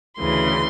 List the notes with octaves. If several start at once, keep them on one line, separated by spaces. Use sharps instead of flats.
D2 C#3 E3 C6